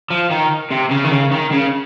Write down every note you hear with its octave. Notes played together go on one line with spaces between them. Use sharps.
F3
D#3
C3
C#3
D#3
C#3
D#3
C#3